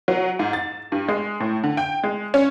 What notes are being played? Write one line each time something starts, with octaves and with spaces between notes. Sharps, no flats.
F#3
G#2
A6
G2
G#3
A2
D3
G5
G#3
C#4